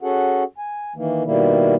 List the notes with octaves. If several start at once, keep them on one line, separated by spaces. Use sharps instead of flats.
C#4 F#4 G#4 A4 F#5
G#5
D#3 E3 A#3
B2 D#3 G3 A#3 E4